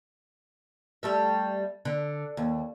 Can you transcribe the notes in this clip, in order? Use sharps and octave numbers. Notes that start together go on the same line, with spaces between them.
G3 A3 E5
D3
D#2